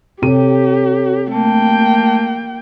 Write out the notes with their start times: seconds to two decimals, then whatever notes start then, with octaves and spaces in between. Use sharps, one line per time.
0.22 C3 G4 A4 C#5 D#7
1.31 A3 A#3 G5 A5